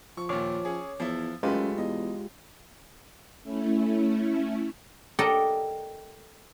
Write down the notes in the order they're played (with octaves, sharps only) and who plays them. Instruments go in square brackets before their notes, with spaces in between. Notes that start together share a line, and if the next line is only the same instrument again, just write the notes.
[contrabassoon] F3 [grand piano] C#6
[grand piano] D#2 A#2 [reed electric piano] C#5 D6
[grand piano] C#4 G#4
[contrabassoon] E2 [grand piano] F3 E4
[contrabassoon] F#2 [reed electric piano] G#3 F4 G4 [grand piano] A3 B4
[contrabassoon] E2 [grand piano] D#5
[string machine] A3 C#4 E4
[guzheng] A4 A#4 D5 D#5 F#5 G5